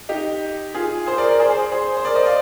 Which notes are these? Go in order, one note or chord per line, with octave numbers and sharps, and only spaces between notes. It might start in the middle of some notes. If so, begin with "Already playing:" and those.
D#4 G4
F4 G#4
G#4 C5
A#4 D5
A#4 D5
G#4 C5
G#4 C5
G#4 C5
C5
A#4 D5
C5 D#5
D5 F5